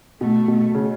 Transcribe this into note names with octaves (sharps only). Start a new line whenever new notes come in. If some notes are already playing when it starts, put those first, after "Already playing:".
B2 A3
B2
C#3